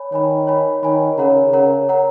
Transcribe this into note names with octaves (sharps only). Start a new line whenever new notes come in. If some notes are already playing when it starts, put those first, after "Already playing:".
Already playing: C#5 G#5 B5
D#3 C#5 G#5 B5
C#5 G#5 B5
D#3 C#5 G#5 B5
C#3 A#4 C#5 F#5 A#5
C#3 A#4 C#5 F#5 A#5
A#4 C#5 F#5 A#5